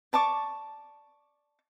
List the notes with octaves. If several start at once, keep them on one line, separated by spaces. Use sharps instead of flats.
D5 A5 C#6 D6